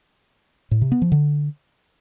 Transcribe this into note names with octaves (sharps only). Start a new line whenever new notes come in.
A2
C3
B3
F3
D3